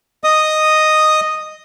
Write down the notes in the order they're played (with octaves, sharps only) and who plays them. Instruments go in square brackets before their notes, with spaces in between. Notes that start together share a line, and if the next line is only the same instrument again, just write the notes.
[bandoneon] D#5 D#6